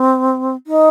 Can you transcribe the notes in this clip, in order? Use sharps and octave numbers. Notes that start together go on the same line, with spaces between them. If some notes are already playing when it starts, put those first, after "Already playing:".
Already playing: C4
D#4